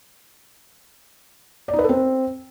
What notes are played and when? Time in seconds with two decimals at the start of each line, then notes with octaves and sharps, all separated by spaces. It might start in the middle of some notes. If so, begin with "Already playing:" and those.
1.68 D5
1.73 D#4
1.79 B4
1.84 A4
1.89 C4